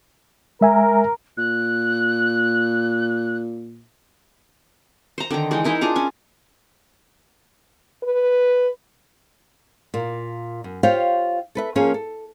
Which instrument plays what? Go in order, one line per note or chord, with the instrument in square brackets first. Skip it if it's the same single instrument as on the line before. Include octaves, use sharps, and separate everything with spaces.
[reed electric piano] G#3 E5 G#5 [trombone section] A#4
[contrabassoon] A#2 [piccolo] F#6
[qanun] C5 A#5
D3 D#3 D#4 A#5
E3 G#3 D#4
D#4 E4 A#4
D4 F4 G#4 A#5
C#4 G#5
[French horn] B4
[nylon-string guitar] A#2 A#3
F#2
F4 G4 C5 C#5 F5 G5
A4 B4 E5
F3 A#3 C#4 G#4 A#4
A4